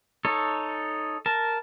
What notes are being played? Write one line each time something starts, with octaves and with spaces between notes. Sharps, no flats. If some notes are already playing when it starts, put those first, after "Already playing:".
D#4 A4 C#5
A#4 A5